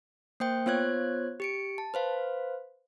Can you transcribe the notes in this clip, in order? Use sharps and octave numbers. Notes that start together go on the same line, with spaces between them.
A#3 C5 G5 G6
B3 F4 C5 C#5 F#6 G#6
G4 C#7 D7
A5
B4 C5 F5